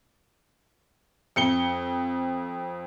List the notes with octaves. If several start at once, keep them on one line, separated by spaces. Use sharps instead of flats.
F2 C#7 G7